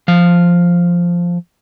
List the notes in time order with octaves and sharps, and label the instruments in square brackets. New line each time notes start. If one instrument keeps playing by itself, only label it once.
[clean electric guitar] F3 F5